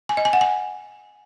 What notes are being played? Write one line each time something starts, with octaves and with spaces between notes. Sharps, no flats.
G#5
D#5
G#5
F#5
G#5